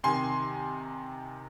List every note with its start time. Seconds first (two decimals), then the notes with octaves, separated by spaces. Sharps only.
0.04 C3 D#3 G#5 C6